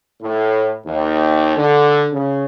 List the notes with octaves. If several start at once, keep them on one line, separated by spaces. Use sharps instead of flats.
A2
D#2
D3
C#3